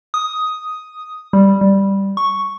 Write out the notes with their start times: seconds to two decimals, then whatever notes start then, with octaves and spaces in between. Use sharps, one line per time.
0.14 D#6
1.33 G3
1.61 G3
2.17 C#6